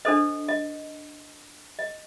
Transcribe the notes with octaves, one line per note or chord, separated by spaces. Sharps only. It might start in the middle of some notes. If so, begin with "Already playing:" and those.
D4 A4 C5 D#5
D#5
D#5